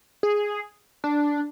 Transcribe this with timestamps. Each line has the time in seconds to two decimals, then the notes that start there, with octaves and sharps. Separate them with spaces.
0.23 G#4
1.04 D4